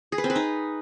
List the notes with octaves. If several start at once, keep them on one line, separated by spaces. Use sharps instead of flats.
G#4
B4
C4
B4
D#4